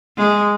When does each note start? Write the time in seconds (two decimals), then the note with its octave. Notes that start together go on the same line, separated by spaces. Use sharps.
0.17 G#3